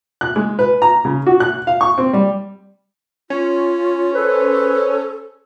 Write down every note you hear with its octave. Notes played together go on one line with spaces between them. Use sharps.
F#6
G#3
B4
A#5
C#3
F#4
F#6
F5
C#6
C4
G3
C#4 F4
G#4 A4 B4 C5